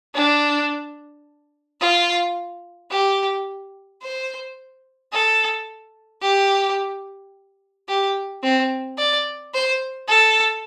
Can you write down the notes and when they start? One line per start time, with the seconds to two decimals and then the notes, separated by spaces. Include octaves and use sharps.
0.15 D4
1.81 F4
2.91 G4
4.02 C5
5.12 A4
6.22 G4
7.88 G4
8.43 C4
8.98 D5
9.54 C5
10.08 A4